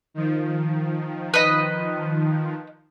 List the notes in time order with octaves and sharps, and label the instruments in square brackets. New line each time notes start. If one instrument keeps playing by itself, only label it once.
[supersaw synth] D#3 F3
[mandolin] B4 D#5